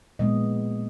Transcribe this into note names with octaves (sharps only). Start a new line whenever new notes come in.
A#2 F3 G#3 B3 D#5